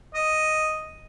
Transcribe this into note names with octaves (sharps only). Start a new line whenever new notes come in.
D#5